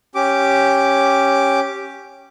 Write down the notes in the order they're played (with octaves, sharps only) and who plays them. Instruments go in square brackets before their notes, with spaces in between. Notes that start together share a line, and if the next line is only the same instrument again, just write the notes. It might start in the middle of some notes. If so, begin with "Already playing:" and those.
[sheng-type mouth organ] C#4 G4 D6